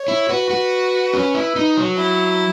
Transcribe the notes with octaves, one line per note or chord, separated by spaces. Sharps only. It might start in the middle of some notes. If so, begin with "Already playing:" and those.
Already playing: C#5
E4
F#4 B4
F#4
C#4
E4
D#4
F#3
E4